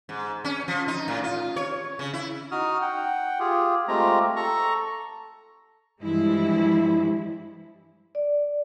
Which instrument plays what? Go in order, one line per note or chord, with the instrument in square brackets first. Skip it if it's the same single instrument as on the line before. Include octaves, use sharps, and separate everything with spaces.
[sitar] G#2
C#4
F3
D#4
A2
F4
C#5
C#3
E4
[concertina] D#4 F#4 D#6 F6
F#5 G5
F4 G4 G#4
G#3 A3 C4 F4 G4 A#5
A4 A#5 C#6
[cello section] G2 E3 F3 G#3 E4
[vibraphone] D5